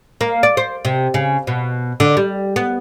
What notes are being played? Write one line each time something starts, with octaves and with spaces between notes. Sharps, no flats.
A#3
D5
C5
C3
C#3
B2
D3
G3
B3